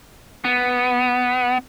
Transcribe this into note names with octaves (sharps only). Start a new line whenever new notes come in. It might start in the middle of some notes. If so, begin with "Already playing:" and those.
B3